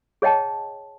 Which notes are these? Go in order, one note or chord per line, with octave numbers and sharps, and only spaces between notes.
G#4 C#5 D#5 G5 A5